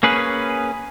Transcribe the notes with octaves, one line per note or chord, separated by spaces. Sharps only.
A#3 C#4 G#4 B4